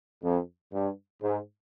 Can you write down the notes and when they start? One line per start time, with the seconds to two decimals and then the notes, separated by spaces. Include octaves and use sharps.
0.23 F2
0.73 G2
1.22 G#2